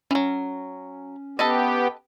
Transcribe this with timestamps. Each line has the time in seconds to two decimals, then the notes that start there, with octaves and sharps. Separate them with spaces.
0.11 E3 F#3 C#4
1.39 B3 G4 A4 B4 D#5